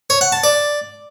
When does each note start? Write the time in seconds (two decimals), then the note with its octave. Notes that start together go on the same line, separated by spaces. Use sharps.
0.10 C#5
0.21 F#5
0.32 A5
0.44 D5